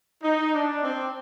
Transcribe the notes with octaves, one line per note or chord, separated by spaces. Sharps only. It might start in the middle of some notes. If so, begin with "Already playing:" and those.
D#4
D4
C4